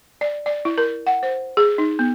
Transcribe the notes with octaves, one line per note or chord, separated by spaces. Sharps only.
D5
D5
E4
A#4
F#5
C5
G#4
D#4
B3